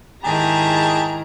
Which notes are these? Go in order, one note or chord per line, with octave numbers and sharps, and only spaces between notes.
G#2 D#3 E4 G4 G#4 A5 A#5